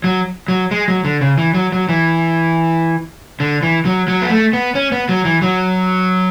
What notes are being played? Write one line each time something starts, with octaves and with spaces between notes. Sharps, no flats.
F#3
F#3
G#3
F#3
D3
C#3
E3
F#3
F#3
E3
D3
E3
F#3
F#3
B3
A3
B3
C#4
B3
F#3
E3
F#3